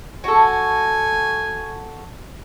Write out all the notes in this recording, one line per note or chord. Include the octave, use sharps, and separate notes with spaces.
F#4 A4 G#5